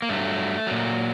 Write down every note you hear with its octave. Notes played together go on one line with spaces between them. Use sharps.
A#3
G2 F#3 A3
A#2 F#3